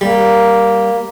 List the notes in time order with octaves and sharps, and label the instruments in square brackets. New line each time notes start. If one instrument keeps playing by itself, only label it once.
[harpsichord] G3 [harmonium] A#3